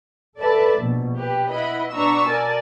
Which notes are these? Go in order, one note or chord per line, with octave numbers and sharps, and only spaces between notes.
A4 B4 D5 E5 A5
A#1 B2
G4 B4
E4 B4 D#5 E5 F#5 B5
B2 D4 B4 A#5 C#6 E6
A#4 D5 G#5 A5